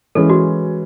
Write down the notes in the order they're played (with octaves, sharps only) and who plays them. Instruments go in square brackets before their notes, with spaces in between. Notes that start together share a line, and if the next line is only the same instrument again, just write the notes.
[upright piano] E3 G#3 C#4 [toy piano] A4
[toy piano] F#4